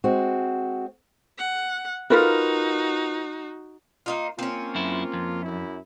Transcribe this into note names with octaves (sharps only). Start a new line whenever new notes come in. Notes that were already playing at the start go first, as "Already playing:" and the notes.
G#3 C4 F#4
F#5
D#4 F4 F#4 A#4 B4
A#3 D#4 F4
A#3 C4 C#4 F4
F#2 E4
F2
F#2 E4